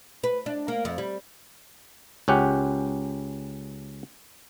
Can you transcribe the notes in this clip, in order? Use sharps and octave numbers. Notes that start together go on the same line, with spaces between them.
B4
D4
A#3
F2
G3
C#2 C#4 G4 F#5